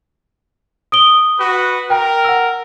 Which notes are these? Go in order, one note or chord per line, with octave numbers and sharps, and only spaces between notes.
D#6 D7 G7
F#4 B4
A#4 G5
F#5 E6